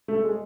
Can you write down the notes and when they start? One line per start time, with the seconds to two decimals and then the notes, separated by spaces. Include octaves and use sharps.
0.08 A3
0.24 G#3